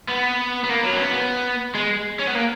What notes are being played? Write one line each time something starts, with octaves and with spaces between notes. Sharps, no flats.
B3
B3
A#3
F#3
C#4
B3
B3
G#3
C#4
B3
A#3